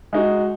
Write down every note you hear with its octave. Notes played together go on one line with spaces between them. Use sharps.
G#3 D#4 F#4